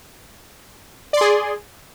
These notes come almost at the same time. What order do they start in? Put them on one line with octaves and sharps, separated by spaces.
D5 C6 G#4